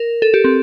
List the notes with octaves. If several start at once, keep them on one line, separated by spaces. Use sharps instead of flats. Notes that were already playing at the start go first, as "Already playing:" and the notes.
Already playing: A#4
A4
G4
C4